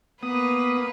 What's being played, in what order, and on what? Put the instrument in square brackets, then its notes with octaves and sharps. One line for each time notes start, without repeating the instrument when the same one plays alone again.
[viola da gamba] A#3 B4 [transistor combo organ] B3 D#6